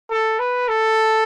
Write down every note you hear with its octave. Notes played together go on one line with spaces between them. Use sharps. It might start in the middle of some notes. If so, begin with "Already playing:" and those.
A4
B4
A4